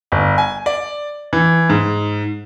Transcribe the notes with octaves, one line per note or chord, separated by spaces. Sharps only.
G1
G#5
D5
E3
G#2